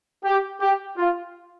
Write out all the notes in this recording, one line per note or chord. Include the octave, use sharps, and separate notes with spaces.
G4
G4
F4